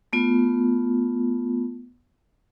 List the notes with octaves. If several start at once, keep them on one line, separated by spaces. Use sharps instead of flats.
A3 B3 F4